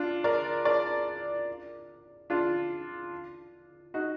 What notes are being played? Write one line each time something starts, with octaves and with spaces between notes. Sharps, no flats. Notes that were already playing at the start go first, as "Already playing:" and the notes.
Already playing: D4 F4
A#4 D5
A#4 D5
D4 F4
D#4 F#4